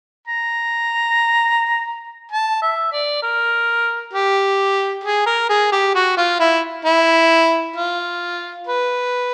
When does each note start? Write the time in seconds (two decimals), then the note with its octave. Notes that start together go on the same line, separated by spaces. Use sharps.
0.28 A#5
2.32 A5
2.62 E5
2.92 D5
3.22 A#4
4.13 G4
5.04 G#4
5.26 A#4
5.50 G#4
5.72 G4
5.95 F#4
6.17 F4
6.40 E4
6.85 E4
7.76 F4
8.67 B4